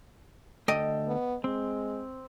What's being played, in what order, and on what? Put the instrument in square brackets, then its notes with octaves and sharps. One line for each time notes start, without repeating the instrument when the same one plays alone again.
[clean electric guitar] D2 A4 G5 [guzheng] D#5
[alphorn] B3
[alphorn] G#3 [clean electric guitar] C4